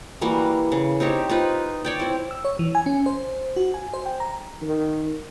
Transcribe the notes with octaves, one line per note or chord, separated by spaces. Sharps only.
E3 G3 A#3 F#4
C#3
C4 D#4 G4 C#5
D#4 F4 B4
C#5 D5 G5
C4 E4
E6
C#5
E3
G#5
C#4
C5
F#4
G#5
C5
G5
A#5
D#3